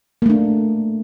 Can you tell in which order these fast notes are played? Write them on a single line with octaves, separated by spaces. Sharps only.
A#3 A3 D4